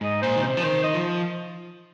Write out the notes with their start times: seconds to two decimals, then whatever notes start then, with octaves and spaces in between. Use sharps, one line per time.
0.01 G#2 D#5
0.22 A#2 C5
0.36 D#3
0.42 C3 C5
0.57 F3
0.63 D#3 C5
0.84 D#5
0.94 F3